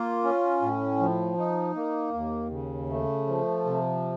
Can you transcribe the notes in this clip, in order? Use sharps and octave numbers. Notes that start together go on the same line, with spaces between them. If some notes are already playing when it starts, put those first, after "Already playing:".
Already playing: A#3 F4
C#4
A2
F3
D#4
A#3
D#2
C#3
A3
F3
C3